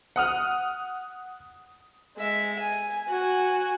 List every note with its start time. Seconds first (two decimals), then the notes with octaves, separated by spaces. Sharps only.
0.16 F#5 D#6 F6
2.17 G#3 E5
2.59 G#5
3.09 F#4 G#5